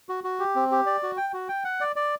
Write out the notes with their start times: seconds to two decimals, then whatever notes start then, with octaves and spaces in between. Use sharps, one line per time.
0.09 F#4
0.24 F#4
0.39 G4
0.56 C4
0.71 G4
0.86 D5
1.03 F#4
1.17 G5
1.33 F#4
1.49 G5
1.64 F#5
1.80 D5
1.96 D5